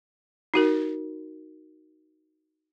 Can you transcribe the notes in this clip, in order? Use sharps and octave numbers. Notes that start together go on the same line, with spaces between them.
D#4 F#4 A#4